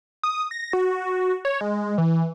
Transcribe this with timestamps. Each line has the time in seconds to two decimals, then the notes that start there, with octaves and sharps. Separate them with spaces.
0.23 D#6
0.51 A#6
0.73 F#4
1.45 C#5
1.61 G#3
1.98 E3